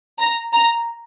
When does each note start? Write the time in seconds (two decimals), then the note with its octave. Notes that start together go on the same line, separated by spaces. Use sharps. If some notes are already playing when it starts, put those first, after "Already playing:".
0.19 A#5
0.53 A#5